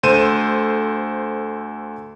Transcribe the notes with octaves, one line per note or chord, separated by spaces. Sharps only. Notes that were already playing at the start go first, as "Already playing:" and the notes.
D2 A4 C5 D#7 E7